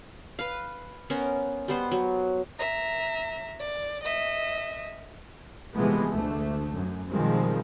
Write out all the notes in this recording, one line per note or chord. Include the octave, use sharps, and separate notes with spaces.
B4 F5
B3 C#4 A#4 C5
G3 B3 C5
F#3
E5 A#5
D5
D#5 E5
C3 E3 F3 G#3 A3 B3
D2 A3
F#2
B2 D#3 F3 G3 G#3 C4